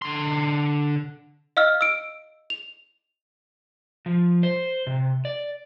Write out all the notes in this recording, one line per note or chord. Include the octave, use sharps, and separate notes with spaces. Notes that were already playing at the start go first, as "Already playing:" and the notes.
D3 C6
D#5 F5 E6 F6
E6 D7
F7
F3
C5
C3
D5